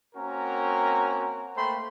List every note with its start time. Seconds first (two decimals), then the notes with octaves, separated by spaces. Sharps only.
0.15 A#3 C4 C#4 F#4 A#4 A#5
1.56 A3 A#3 C5 G5 B5 C6